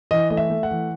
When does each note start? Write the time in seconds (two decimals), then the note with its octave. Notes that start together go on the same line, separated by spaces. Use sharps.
0.11 E3 D#5
0.30 A3 D#5
0.37 E5
0.50 A3
0.63 F#5
0.71 E3